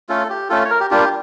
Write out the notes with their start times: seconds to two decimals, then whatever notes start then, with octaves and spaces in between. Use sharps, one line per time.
0.09 A3 C#4 F4 A4
0.30 G4
0.49 A3 C#4 F4 A4
0.65 C#5
0.70 A#4
0.80 G4
0.90 G3 A#3 D4 F4 G4